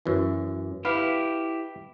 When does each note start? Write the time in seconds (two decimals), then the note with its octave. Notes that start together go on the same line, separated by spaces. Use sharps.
0.06 F#2 E3
0.85 E4 G4 B4 F5